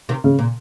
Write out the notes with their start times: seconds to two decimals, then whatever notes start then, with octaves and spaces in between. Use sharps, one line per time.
0.09 C3 D#3
0.24 C#3
0.39 A#2